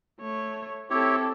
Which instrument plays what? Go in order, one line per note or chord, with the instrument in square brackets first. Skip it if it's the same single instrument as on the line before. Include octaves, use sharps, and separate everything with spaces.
[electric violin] A3 C#5
[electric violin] C4 A4 [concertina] E4 G4 C#5